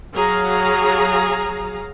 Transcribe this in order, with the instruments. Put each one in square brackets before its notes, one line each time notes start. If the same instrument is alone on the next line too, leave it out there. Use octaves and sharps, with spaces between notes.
[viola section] F#3 G#4 F5 A#5